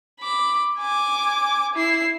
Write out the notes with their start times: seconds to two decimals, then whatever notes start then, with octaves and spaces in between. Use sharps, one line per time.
0.20 B5 D6
0.80 G#5 D6
1.75 E4 C7